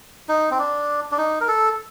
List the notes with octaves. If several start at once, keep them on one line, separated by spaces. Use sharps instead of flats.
D#4
C4
D4
D4
D#4
A#4
A4